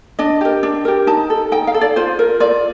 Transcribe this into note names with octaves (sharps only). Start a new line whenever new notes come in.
D4 D#5
G4 A#4
D4
G4 A#4
D#4 A5
A4
D#4 G5
F5
A4
D5
F4 C5
A#4
F4 D5